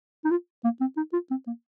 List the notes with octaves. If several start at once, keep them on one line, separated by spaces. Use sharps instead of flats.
D#4
F4
A#3
C4
D#4
F4
C4
A#3